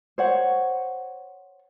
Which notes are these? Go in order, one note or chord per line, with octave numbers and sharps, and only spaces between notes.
C5 C#5 F#5